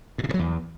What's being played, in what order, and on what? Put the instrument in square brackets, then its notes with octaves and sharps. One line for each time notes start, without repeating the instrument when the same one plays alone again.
[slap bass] A2
C3
A2
F#3
E2